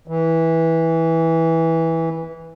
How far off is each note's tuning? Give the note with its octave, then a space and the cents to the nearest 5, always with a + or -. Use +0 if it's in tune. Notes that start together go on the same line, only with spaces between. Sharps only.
E3 -15